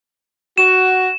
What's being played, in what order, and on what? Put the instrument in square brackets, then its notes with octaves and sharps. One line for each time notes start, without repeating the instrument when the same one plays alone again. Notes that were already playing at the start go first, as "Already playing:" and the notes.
[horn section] F#4 [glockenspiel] E7